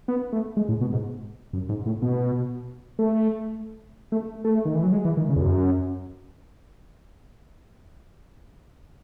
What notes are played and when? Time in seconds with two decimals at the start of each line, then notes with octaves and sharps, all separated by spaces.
0.08 B3
0.32 A3
0.57 G#3
0.69 A2
0.81 B2
0.93 G#2
1.53 F#2
1.69 G#2
1.86 A2
2.02 B2
2.99 A3
4.12 A3
4.44 A3
4.65 D#3
4.74 E3
4.84 F#3
4.92 G#3
5.05 E3
5.17 D#3
5.29 C#3
5.36 E2
5.41 F#2